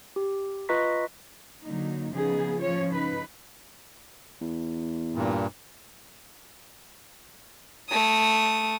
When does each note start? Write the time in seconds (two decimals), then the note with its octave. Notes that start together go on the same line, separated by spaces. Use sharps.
0.16 G4
0.69 F4 B4 D#5 A#5 C#6 B6
1.65 D3 F#3 A#3 D#4
2.13 C#3 F3 B3 D#4 G#4
2.60 F3 C#4 F4 C#5
2.90 C#3 D#4 B4
4.41 E2
5.15 G2 A#2
7.90 A3 D#6